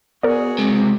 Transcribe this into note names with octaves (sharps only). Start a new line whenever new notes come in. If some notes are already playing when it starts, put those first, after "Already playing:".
B3 F#4 G#4 A#4 D5
C#2 C3 G#3